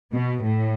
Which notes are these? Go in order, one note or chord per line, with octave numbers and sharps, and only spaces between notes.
B2
A2